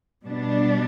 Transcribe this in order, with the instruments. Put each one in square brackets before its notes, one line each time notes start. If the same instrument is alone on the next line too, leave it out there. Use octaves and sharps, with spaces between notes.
[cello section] B2 G3 B3 D4